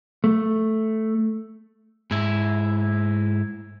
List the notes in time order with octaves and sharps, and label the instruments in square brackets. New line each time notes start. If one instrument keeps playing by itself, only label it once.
[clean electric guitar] A3
[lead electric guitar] G#2 E4